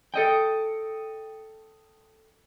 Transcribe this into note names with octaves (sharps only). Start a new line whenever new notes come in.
A4 D#5 G5